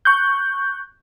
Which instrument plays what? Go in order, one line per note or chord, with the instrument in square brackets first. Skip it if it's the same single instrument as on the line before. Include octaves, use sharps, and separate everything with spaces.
[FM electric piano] C#6 F#6 G6